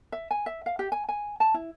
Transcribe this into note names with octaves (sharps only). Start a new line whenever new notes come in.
E5
G#5
E5
F5
G4
G#5
G#5
A5
E4